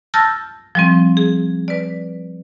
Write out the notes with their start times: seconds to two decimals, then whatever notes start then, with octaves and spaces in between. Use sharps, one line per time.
0.14 A5 E6 F6 G6 A6 A#6
0.75 F3 G3 C4
1.17 G#4
1.68 B4 D5